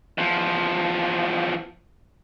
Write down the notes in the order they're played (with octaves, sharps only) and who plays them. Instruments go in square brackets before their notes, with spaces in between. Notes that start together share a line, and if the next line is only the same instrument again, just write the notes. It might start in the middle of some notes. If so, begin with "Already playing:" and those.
[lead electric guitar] E2 F3